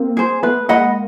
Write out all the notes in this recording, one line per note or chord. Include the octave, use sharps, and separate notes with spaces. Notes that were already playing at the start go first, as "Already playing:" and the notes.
Already playing: A#3 C4
G#4 C5
A3 B3 B4
G#3 A#3 D#5 F#5 B5